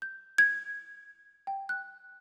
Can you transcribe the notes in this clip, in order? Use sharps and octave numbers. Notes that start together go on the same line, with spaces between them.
G6
G#6
G5
F#6